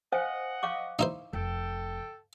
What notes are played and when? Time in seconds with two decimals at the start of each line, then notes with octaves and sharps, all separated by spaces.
0.12 C5 D#5 F5 F#5 G#5
0.63 F5 C#6 D6
0.99 D#4 E4 C5
1.33 F1 A4 G5